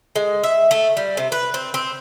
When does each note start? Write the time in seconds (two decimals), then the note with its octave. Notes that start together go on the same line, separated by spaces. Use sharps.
0.16 G#3
0.44 E5
0.71 A3
0.97 G3
1.17 C3
1.32 B4
1.54 C4
1.74 C4